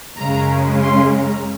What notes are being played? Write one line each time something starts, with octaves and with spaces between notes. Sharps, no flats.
F#2 C#3 G#3 C#4 A#5
C6
A#5